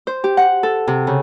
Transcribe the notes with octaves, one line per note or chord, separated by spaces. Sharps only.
C5
G4
F#5
A4
C3
C#3